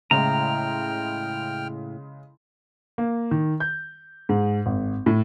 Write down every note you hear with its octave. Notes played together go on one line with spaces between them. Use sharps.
A2 C#3 G#3 G5 A#5 F6
A#3
D#3
G6
G#2
G#1
A2